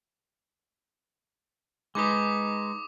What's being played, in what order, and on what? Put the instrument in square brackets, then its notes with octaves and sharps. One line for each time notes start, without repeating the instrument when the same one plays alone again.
[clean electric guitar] G#3 D#4 B4 [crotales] D6 D#6